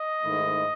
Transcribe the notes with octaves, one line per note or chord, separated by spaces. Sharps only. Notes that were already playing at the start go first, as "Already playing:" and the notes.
Already playing: D#5
G#2 D#3 A3 E4